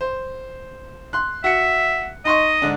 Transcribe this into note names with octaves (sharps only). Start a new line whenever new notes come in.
C5
C6 F#6
F#4 E5 C#7
D#4 D#5 C6 C#6
G#2 D3 D4